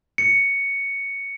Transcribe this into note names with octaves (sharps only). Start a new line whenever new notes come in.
C#7